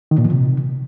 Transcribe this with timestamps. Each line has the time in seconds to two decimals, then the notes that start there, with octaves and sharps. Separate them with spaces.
0.11 D#3
0.18 A#2
0.25 F3
0.32 C3